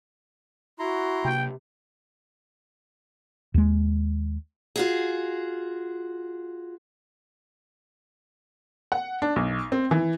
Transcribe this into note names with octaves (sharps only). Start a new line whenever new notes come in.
E4 F#4 A#5 C6
C3 A#3 G5
D#2 G#3
F4 F#4 G#4
F#5
D4
B1
C4
E3